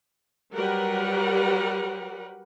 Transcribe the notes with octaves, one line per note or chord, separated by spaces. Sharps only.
F#3 G3 G4 A#4 B4 F#5